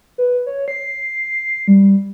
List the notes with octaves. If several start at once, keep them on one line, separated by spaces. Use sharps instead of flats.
B4
C#5
C7
G3